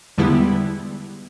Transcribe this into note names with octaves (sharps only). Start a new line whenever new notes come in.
E2 D3 G3 G#3 B3 E4